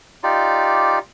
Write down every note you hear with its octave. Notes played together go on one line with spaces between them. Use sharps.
D#4 F4 G4 D5